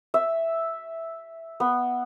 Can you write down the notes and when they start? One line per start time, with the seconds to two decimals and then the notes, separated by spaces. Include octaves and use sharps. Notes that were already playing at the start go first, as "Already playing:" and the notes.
0.14 E5
1.60 B3